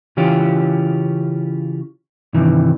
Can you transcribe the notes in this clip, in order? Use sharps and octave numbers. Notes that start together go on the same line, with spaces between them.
C#3 E3 C#4 F4 G4
G2 C3 D#3 E3